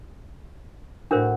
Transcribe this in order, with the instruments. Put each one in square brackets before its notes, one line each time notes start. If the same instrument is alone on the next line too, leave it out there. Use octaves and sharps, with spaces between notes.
[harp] A2 F#4 [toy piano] D4 A#4 C5